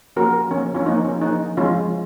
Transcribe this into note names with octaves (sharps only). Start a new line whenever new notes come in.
F3 A#3 C#4 F#4 A#4
F3 A#3 C#4
C#4 F4
F3 A#3 C#4 D#4
C#4
F3 A#3 C#4 D#4
F3 G#3 C4 C#4 F4